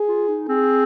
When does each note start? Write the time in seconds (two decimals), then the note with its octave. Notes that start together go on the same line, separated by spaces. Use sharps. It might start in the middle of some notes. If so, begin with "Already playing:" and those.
Already playing: G#4
0.08 F4
0.28 D#4
0.48 C4 G#4